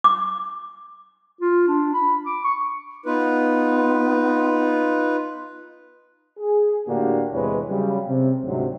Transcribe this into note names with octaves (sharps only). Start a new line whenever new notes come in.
D6
F4
D4
B5
D6
C#6
B3 D#4 F4 B4
G#4
A2 D3 A#3 D4 F#4 G4
E2 C3 E3 G#3 B4 C#5
C#3 F#3 G3
C3
D2 G#2 C3 F#3